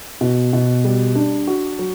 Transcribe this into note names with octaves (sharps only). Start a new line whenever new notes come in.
B2
B2
G3
D4
F#4
F#3